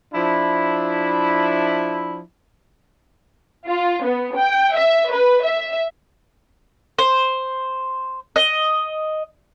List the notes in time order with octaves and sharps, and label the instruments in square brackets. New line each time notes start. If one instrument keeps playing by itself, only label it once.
[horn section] F3 D4 E4
[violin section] F4
B3
G5
E5
B4
E5
[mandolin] C5
D#5